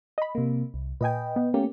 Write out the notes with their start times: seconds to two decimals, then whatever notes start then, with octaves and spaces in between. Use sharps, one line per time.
0.18 D#5 B5
0.35 C3 A#3
0.74 C2
1.01 A#2 B4 D#5 G5 G#5
1.36 B3
1.54 A3 A#3 C#4 G4